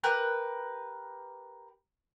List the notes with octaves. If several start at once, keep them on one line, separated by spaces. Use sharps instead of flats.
G4 A#4 B4 F#6